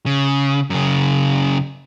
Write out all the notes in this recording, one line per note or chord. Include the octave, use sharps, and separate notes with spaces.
C#3
F#2 C#3